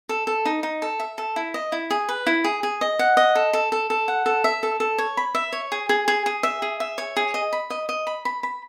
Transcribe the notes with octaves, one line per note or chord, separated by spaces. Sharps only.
A4
A4
D#4
D#4
A4
E5
A4
E4
D#5
E4
G#4
B4
E4
G#4
G#4
D#5
F#5
D#5
A4
A4
A4
A4
F#5
A4
E5
A4
A4
C#5
B5
E5
C#5
G#4
G#4
G#4
G#4
E5
G#4
E5
C#5
G#4
D#5
B5
D#5
D#5
B5
B5
B5